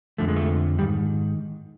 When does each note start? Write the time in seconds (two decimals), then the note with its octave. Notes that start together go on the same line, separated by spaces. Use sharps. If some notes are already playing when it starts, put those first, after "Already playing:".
0.18 F2 D3 F3 A3
0.28 G#3
0.36 A3
0.78 D#3 G3
0.82 G#2